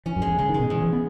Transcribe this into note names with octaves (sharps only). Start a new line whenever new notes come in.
E3 C#4
F#2
G#3
E2
C#3 G#3
D#3
G#3
B2
E2
E3
B3